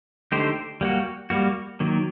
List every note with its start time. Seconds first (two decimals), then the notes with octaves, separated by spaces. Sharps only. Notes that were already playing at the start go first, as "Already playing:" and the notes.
0.32 D3 A3 D#4 G4 C5
0.81 G3 A#3 F#4
1.30 G3 A#3 F#4
1.80 D#3 F#3 A#3